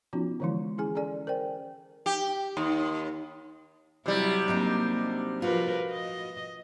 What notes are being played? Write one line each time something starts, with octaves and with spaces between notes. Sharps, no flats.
F3 B3 C#4 D#4 F4 F#4
D3 E3 F3 G#3 E4
C#4 E4 G#4 G#5
C#4 G#4 A4 D5 G#5
A#4 C5 D5 G5
G4
D#2
C3 F#3 G3 E4
F#3 A#3 C4 D4 D#4
F3 F4 F#4 A#4 B4
D#5